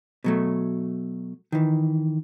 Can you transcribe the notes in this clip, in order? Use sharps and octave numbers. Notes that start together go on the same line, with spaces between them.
B2 F#3 A3
D#3 E3